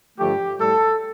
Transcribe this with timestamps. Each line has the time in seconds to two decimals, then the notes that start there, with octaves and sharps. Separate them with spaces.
0.19 G2 D3 F3 A3 G4
0.60 A2 G3 A4